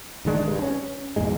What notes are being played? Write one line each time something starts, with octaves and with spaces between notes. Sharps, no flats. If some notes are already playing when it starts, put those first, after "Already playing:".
E1 D#3 G#3 D4
G2
C#4
B1 E2 G#2 G#3